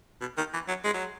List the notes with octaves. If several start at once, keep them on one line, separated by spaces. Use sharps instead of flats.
B2
D#3
E3
F#3
G#3
F#3